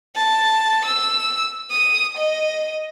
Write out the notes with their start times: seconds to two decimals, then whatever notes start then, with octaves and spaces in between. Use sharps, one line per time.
0.16 A5
0.86 E6
1.70 D#6
2.17 D#5